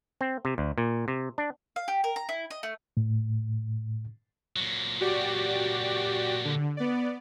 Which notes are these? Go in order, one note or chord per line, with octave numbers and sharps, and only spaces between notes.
C4
C3
D2
A#2
C3
D4
F5
G4
A#4
A#5
E4
D#5
A3
A2
A#2 F#3
F#4 G4 D5
D3
B3 D5